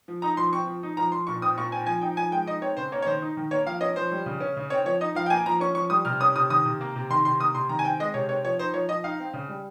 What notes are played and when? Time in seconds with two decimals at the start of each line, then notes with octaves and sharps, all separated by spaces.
0.08 F3
0.22 D#4 A#5
0.37 F3 C6
0.52 C4 C#6
0.67 F3
0.83 D#4
0.97 F3 A#5
1.12 F3 C6
1.27 A#2 C#6
1.42 C4 D#6
1.58 A#2 C#6
1.72 C4 G#5
1.87 F3 G#5
2.01 D#4 G5
2.17 F3 G#5
2.32 G#3 G5
2.46 D#4 D#5
2.61 C4 C#5
2.77 C#3 C5
2.92 A#3 C#5
3.02 C#5
3.07 D#3 C5
3.22 D#4
3.37 D#3
3.51 A#3 C#5
3.66 F3 F5
3.81 C#4 D#5
3.96 F3 C5
4.12 G3
4.26 C#3
4.40 C#4
4.57 C#3
4.70 C4 C#5
4.86 F3 C#5
5.01 D#4 D#5
5.15 F3 F5
5.26 G5
5.30 A#3 G#5
5.46 F3 A#5
5.60 C#4 C#6
5.75 F3 C#6
5.90 G3 D#6
6.05 C3 F6
6.20 C#4 D#6
6.36 C3 D#6
6.50 D#3 D#6
6.65 C3
6.81 A#3
6.96 C3
7.10 D#3 C6
7.25 C3 C6
7.40 A#3 D#6
7.55 C3 C6
7.69 D#3 A#5
7.79 G#5
7.84 C4 G5
8.00 G#3 D#5
8.14 C3 C#5
8.29 C4 C#5
8.44 F3 C#5
8.59 D#4 C5
8.74 F3 C#5
8.89 F3 D#5
9.04 D#4 F5
9.20 C4
9.34 C#3
9.49 G3